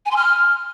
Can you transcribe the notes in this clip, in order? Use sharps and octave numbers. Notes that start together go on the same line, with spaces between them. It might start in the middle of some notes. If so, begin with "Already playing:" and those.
G#5
C6
F6